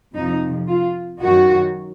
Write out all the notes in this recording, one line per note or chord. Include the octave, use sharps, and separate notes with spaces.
F2 C3 F3 D#4
F4
F#2 D#3 F#4